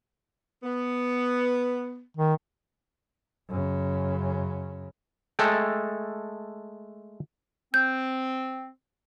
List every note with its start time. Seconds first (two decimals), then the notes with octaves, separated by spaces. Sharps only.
0.63 B3
2.17 D#3
3.48 F#2 C#3
5.39 G#3 A3 A4 G5
7.74 C4 G6